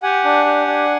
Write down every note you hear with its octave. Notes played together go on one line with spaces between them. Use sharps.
G4 F#5 G#5
D4
G4
D4